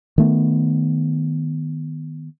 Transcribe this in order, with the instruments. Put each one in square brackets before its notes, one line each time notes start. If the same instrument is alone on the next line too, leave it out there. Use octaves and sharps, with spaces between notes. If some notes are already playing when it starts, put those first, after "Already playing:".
[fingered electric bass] D#3 A3 B3